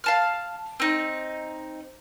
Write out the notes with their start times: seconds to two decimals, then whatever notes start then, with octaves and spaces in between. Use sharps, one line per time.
0.04 F5 A5 F6
0.80 C4 D#4